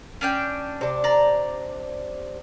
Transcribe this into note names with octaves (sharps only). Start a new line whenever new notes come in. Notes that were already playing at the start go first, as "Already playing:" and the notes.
C#4 D4 G5
C3 D4
D5 A#5